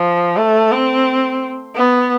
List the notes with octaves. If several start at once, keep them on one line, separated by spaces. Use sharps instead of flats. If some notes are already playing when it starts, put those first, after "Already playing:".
Already playing: F3
A3
C4
B3